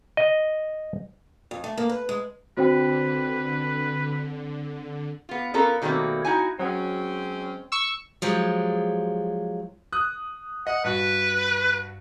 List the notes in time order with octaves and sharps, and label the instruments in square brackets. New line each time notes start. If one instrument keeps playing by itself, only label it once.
[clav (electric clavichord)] D#5
[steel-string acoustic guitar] F2
A3
A#3
B4
G#3
[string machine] D3 [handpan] C4 D4 [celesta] F#4 C5 G5 [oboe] B4
[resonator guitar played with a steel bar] B3 F4
B3 C#4 F4 A4 A#4
B2 D#3 G3 A3 A#3 C4
D#4 E4 F#4 G#5
[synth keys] F#3 [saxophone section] G#3 C4 C#4
[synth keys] C#6 E6
[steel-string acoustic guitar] F3 F#3 G#3 G4
[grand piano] D#6 F#6
[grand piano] D#5 [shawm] F#5
[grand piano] G2 F#4 [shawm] B4